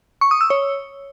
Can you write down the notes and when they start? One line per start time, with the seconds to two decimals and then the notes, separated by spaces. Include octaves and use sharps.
0.21 C#6
0.31 D#6
0.41 E6
0.50 C#5